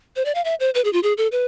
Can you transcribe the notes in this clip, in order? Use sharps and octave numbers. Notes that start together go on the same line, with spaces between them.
C5
D5
F5
E5
C5
B4
G#4
F4
G#4
A4
B4